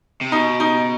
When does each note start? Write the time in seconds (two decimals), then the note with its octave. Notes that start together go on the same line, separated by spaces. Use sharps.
0.21 C3
0.32 B2 D#4
0.60 D#4